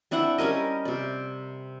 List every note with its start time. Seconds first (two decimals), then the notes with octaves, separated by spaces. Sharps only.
0.11 C4 D4 E4 F#5
0.38 G3 C#4 A#4 D#5
0.85 C3 D5